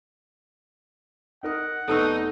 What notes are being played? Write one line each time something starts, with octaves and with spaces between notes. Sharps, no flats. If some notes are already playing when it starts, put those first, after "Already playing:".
D#4 A#4 F#5 D#6
F1 B3 D#4 A4 A5 C#6 E6